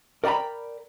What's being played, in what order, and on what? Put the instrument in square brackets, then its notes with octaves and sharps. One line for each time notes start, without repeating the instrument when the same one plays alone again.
[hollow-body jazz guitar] A#4 D5 G5 A#5 B5